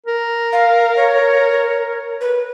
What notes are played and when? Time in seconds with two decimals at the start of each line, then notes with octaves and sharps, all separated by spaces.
0.07 A#4
0.53 F5
0.97 C#5
2.21 B4